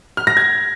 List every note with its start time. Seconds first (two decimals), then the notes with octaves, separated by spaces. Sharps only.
0.17 F6
0.27 A#6
0.37 G#6